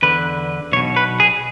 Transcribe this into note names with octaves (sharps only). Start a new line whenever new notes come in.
E2 D3 B4
B1 B2 C#5
B4
G#4